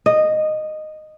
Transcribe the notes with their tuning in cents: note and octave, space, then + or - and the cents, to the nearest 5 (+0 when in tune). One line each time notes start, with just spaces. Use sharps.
D#5 -10